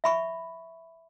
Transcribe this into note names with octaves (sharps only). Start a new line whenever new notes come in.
E5 B5 C#6